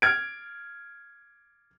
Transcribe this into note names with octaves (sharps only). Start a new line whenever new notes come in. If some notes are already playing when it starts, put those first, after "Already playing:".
F6 G#6 D7